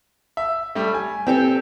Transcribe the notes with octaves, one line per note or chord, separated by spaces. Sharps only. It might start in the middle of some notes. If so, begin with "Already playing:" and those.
E5
G3 A3
G#5
C4 G4 A4